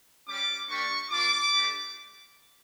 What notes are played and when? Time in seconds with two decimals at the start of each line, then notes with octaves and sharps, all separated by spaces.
0.28 G3 C#4 G4 D6
0.69 A#3 D4 G4 C#6
1.11 A#3 D4 F4 D6
1.52 A3 D4 G4